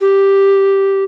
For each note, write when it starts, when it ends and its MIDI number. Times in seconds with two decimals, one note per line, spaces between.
0.01 1.04 67